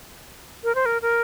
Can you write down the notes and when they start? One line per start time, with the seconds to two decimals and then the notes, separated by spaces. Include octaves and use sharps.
0.64 A#4
0.75 C5
0.86 A#4
1.02 A#4